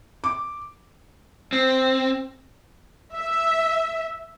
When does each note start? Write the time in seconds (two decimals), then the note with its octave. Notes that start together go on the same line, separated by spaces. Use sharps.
0.24 D6
1.53 C4
3.15 E5